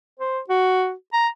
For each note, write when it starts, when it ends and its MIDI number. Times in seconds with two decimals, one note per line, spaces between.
0.20 0.40 72
0.49 0.93 66
1.13 1.28 82